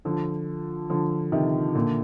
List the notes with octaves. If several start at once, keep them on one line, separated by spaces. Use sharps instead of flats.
D3 F3
D3 F3
C3 D#3
A#2 D3